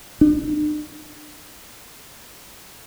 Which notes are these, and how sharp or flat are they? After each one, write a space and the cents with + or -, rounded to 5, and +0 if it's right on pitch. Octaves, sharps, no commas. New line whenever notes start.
D4 +45